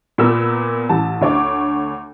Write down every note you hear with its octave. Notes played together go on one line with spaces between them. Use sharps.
A#2 B3 A#4 E6
A1 A5
D2 C#5 D6